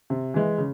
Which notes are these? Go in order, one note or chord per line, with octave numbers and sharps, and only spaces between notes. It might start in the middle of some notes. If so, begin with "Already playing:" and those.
C3
E3 G#3
C#3